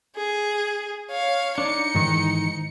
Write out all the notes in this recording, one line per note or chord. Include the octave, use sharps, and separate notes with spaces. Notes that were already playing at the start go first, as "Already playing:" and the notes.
G#4
C#5 F5
D4 D#4 C#7
G#2 D#3 E3